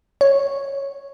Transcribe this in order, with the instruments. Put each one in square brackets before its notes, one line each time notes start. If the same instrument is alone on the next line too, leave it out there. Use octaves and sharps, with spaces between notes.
[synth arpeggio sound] C#5